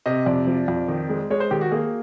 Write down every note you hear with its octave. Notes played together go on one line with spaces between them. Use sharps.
C3 D#5
F2 D5
F3
F2
D#3
G#3
G#3 C#5
C5
D#3 G4
F#4
A#3 G#4